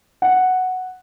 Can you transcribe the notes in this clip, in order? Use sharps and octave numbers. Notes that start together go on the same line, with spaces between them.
F#5